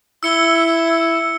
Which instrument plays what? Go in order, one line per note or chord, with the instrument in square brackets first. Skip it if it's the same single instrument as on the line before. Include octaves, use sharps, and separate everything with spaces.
[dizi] E4 [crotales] E6 C#7 G7